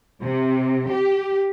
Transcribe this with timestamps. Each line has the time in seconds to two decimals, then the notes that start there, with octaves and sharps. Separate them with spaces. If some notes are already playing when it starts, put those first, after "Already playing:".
0.21 C3
0.89 G4